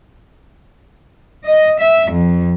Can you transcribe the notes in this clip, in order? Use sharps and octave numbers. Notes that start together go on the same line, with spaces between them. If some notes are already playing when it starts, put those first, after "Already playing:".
D#5
E5
F2